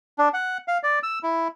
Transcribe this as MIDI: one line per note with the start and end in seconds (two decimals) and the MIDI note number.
0.18 0.29 62
0.34 0.58 78
0.68 0.78 77
0.83 0.99 74
1.03 1.19 88
1.23 1.48 64